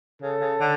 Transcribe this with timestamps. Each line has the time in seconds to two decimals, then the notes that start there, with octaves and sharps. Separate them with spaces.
0.22 C#3 A4
0.41 C#3
0.61 D3